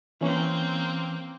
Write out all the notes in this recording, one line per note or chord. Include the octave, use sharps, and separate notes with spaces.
E3 A#3 C4 C#4